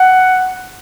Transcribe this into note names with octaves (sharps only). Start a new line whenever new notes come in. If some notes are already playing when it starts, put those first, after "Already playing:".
Already playing: F#5